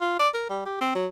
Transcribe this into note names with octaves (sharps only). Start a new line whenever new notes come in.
F4
D5
A#4
G3
G4
C4
F#3